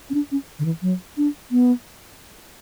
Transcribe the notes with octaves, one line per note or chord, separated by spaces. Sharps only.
C#4
D4
C#4
D3
E3
F#3
D4
B3